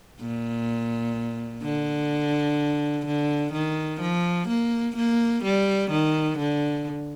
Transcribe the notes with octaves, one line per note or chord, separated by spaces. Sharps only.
A#2
D3
D3
D#3
F3
A#3
A#3
G3
D#3
D3